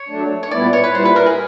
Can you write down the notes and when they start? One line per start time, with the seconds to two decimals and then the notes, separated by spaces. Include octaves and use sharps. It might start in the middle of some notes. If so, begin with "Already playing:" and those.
Already playing: C#5
0.09 F#3 A3 D4
0.43 C#5
0.51 A#2 G3 B3 E4 D5
0.73 C#5
0.84 B4
0.95 A#2 G3 B3 E4 C5
1.05 B4
1.16 A#4
1.26 G#4